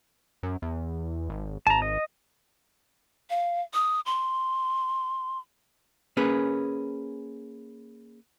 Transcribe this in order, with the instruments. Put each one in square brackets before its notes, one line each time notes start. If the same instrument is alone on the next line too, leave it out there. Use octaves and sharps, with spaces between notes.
[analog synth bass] F#2
E2
G#1
[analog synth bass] G#1 [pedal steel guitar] A5 A#5
[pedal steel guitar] D#5
[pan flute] F5
D#6
C6
[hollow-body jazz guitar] A#3 C#4 G#4 B4